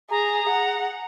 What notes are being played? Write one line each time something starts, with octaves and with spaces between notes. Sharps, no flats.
G#4 A#5
F#5